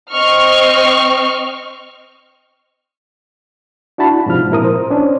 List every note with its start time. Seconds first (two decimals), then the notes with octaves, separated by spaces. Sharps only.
0.11 C4 D#5 C#6 F6
3.98 D4 E4 F#4 A5 B5
4.26 G#2 C3 F3 F6
4.51 A#2 E4 A#4 D#6
4.64 C5
4.91 C#4 D4 C5